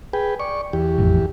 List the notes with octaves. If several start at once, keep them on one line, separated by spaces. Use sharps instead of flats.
G#4 B4 G5
D5 C#6
E2 G4
A1 F2